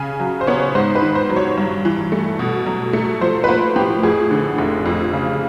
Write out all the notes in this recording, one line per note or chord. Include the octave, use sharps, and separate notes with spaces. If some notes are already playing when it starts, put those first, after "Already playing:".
Already playing: C#3 G#5
F#3
C5
B3 C#5
G#2 C5
B4
D#3
C5
F#3
C#5
G2
E3
A3
B2
F#3
A3
F3 C5
B4
A#3 C5
A2 G4
F2 G#4
D3
F1
F2
C#3